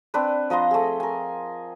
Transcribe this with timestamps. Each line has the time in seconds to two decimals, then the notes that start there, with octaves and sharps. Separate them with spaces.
0.14 C4 D4 B4
0.50 F3 D#5 A#5 C6
0.71 A3 G#4
1.00 A#4 G#5